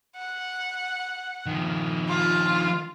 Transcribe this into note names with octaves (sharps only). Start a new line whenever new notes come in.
F#5
D#3 F3
F4